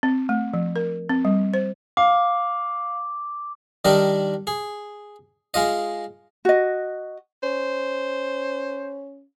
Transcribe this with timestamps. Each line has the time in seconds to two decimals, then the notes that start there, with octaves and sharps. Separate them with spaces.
0.03 C4
0.29 A3
0.54 F3
0.76 A#4
1.09 C4
1.25 G3
1.54 C5
1.97 F5 D6
3.85 D#3 G3 D4 D#4 A#4
4.47 G#4
5.54 G#3 F4 D#5
6.45 F#4 D#5
7.43 C#4 C5